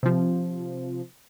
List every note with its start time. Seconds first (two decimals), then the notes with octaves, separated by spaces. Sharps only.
0.03 C3 F3